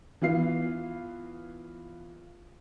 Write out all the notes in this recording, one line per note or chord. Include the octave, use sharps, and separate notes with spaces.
E3 B3 F4 C7